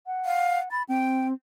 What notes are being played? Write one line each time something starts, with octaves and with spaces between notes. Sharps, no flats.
F#5
F5
B5 A6
C4 G5